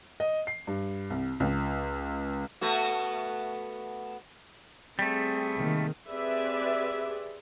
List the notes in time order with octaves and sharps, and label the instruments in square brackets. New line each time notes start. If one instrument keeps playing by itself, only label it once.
[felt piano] D#5
C7
G2
C2
C#2
[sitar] A3 B3 F#4
[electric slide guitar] G3 A3 [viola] C4 G#4
[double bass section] C3 D#3 A#3
[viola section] C4 G4 G#4 B4 D5 E5